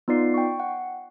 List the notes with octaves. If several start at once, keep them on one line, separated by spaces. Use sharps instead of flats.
B3 D#4 F4 D5 C7
G5 C#6
F#5